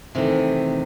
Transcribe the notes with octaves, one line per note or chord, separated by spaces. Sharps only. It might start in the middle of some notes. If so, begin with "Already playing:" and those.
C3 D#3 E3 A3